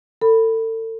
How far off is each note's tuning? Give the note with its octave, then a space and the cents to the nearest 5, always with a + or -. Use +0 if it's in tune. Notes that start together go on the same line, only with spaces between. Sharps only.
A4 +35 B5 +0